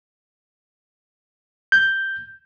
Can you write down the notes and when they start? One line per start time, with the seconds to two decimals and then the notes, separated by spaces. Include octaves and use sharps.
1.72 G6